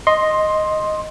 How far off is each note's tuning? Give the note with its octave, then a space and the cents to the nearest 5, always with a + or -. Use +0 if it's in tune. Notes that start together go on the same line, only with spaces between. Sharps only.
D#5 +0 C6 +10